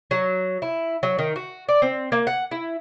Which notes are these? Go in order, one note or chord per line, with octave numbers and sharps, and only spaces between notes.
F#3
E4
F#3
D#3
F#4
D5
C4
A#3
F#5
E4